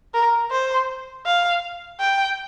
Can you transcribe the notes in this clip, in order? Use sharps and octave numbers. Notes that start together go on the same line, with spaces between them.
A#4
C5
F5
G5